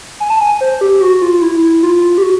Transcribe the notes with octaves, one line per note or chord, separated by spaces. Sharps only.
G#5
A5
G#5
C5
G4
F#4
F4
E4
F4
G4
F#4